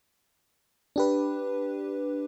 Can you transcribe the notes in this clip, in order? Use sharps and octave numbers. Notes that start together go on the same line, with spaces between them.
D4 G4 B4